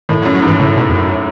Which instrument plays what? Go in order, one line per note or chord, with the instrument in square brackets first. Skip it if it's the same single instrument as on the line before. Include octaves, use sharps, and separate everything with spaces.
[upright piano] A2 [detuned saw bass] D#3
[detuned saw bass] F#3
[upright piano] F#2
[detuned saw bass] F#3
[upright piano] G#2 [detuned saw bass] E3
[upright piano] A2 [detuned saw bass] C#3
[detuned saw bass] B2
E2
F#2